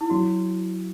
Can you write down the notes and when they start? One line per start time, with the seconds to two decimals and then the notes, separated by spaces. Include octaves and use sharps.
0.01 E4
0.10 F#3 F#4